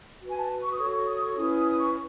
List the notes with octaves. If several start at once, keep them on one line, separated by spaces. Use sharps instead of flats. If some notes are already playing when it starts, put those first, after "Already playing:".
F#4 B4
G#5
A5
C#6
D#6
F#4 A4 C#5 C#6
C#6
D#6
C#6
C#4 E4 B4 D#6
D#6
D#6
C#6